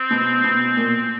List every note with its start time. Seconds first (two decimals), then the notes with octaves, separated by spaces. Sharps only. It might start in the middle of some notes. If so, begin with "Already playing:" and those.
Already playing: C4
0.11 B2
0.44 B2
0.77 A#2